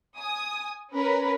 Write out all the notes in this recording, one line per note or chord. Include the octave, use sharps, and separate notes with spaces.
G#5 D#6
C#4 A#4 B4